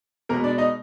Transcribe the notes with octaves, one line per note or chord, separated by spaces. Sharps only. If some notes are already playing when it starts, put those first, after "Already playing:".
B2 G#3 A#3 B3 A#4
D4 D5
D#4 D#5